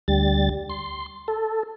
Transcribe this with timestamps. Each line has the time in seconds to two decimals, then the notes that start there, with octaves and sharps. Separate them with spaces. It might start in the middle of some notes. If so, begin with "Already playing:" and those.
0.08 D2 G3 A6
0.70 C6
1.28 A4